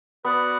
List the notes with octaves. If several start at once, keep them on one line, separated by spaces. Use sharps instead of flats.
B3 F#4 B4 D5 F#5